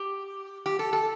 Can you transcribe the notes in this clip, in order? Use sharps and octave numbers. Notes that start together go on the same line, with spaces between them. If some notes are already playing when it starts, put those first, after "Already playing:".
Already playing: G4
G4
A4
A4